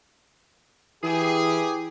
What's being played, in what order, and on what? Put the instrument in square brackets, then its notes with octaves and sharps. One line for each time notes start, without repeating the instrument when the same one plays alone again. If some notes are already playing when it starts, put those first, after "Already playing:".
[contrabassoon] E3 [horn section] G4 G#4